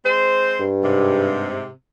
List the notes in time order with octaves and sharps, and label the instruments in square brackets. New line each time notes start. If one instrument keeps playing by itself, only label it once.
[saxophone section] G#3 C4 C5
[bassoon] G2
[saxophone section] G#2 C3